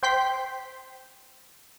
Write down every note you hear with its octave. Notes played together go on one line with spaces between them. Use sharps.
C5 G5 C6 G6 B6